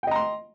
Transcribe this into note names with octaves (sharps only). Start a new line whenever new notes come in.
D#5 G5 A#5 C6